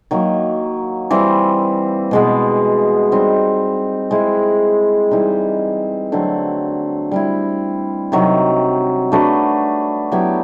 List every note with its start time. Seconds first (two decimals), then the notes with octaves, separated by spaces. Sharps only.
0.11 D#3 F#3 A#3
1.11 E3 G3 C4
2.11 B2 G#3 B3
3.12 G3 C4 D#4
4.11 G#3 C4 E4
5.11 E3 G3 C4 D#4
6.12 D3 F#3 A3 C4
7.11 G3 C4 E4
8.12 C3 D#3 F#3
9.12 A3 D4 F#4 B4
10.12 F#3 B3 E4 G4